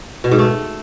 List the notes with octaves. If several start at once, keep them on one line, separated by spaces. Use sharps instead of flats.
B2
G#2
A3